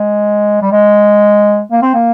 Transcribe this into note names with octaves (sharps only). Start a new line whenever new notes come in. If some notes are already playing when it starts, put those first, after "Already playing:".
Already playing: G#3
G3
G#3
A#3
C4
A#3